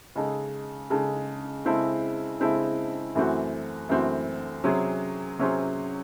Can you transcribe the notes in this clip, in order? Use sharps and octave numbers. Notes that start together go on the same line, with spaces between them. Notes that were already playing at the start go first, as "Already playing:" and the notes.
C#3 G#3 D#4 A4
C#3 G#3 D#4 A4
C#3 G#3 C4 E4 A4
C#3 G#3 C4 E4 A4
F#2 E3 A3 C4 F#4
F#2 E3 A3 C4 F#4
C3 F#3 C#4 G#4 C5
C3 F#3 C#4 G#4 C5